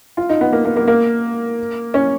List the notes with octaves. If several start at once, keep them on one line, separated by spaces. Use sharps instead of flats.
F4
D#4
B3
A#3
A#3
A#3
A#3
C#4